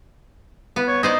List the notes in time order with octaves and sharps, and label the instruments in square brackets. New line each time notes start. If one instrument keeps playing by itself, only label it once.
[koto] B3
[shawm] C#5
[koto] D#4 C5 D5 [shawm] D#5